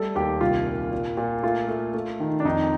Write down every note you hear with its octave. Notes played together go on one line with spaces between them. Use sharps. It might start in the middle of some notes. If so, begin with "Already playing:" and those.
Already playing: G3 A3 A4
D#2 G4
C2 F4
A#2
A#2
A#2
A3 F4
A3
A3
D#3
D4
F2 D#4